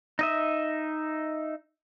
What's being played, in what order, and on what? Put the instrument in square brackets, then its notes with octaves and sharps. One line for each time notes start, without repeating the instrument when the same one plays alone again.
[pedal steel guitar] D#4 D#5 E5